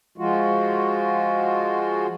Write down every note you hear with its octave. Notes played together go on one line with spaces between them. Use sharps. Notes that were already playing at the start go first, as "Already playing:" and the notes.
F3 G#3 F4 F#4